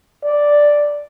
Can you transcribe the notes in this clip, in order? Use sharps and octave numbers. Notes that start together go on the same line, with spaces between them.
D5